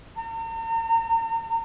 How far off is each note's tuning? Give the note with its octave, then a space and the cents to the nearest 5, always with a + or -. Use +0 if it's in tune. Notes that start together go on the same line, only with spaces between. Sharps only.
A#5 -40